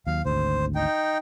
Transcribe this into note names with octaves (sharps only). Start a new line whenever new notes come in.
D#2 F#3 F5
G#1 D2 C5
D#4 G5